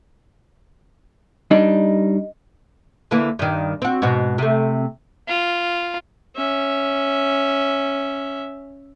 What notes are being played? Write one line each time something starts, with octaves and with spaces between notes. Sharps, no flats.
G3 D4 D#4 D#5
D3 E3 A#3
G2 D#3
C4 F#4
G#2 B2 F#4
C3 A3
F4
C#4 E5